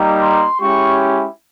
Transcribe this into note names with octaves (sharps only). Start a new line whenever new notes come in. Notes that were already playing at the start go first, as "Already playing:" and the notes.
Already playing: G3 A#3 D#4 G4
C6
G#3 C#4 E4 G4 C#6